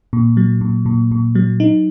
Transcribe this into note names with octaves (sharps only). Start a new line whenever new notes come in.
A#2
F#3
A#2
A#2
A#2
F#3
D#4